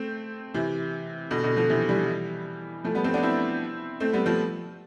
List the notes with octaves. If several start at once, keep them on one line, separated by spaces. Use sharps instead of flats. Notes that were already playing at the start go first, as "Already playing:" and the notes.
Already playing: A3 C4
C3 E3
B2 D3
B2 D3
D3 F3
C3 E3
E3 G3
F3 A3
G3 B3
A3 C4
B3 D4
C4 E4
A3 C4
G3 B3
F3 A3